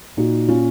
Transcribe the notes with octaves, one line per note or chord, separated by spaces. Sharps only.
A#2 D#4 F#4
C#4 F4